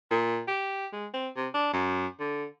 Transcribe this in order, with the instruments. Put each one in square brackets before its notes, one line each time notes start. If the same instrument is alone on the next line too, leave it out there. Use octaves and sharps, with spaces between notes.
[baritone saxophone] A#2
G4
G#3
C4
C3
D4
F#2
D3